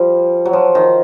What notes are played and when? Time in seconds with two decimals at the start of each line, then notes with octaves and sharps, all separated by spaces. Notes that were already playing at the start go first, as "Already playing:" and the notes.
Already playing: F3 G3
0.45 F#3
0.53 F3
0.75 D#3